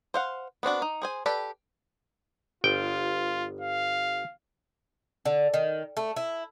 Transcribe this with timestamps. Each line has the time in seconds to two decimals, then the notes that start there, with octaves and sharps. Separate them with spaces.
0.14 C5 F5 F#5
0.63 B3 C4 D4 F#4
0.82 D#4
1.02 G#4 C5 G#5
1.26 G4 A4 B4 D5 G5
2.64 G1 F4 G5
3.61 F5
5.25 D3
5.54 D#3
5.97 A3
6.16 E4